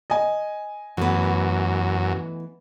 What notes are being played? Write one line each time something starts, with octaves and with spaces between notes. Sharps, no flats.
D#5 G#5
F#2 E3 A3 B3